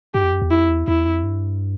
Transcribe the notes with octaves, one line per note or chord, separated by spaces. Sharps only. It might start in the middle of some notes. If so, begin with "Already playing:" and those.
G2 G4
F2
F#2
E2
F2 E4
E2
E2 E4
F2
G2